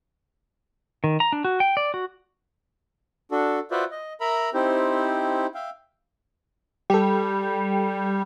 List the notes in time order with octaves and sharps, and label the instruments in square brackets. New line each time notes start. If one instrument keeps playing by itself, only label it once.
[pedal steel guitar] D#3
A#5
D4
F#4
G5
D5
F#4
[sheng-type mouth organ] D4 F#4 A4
F4 F#4 B4 C5 D5 E5
D#5
A#4 E5 A#5 B5
C4 D#4 E4 G4 C5
E5 F5 G5
[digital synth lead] G3 [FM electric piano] G4 A4